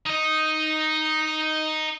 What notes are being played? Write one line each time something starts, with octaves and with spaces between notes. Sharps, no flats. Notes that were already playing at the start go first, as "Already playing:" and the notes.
D#4 D#5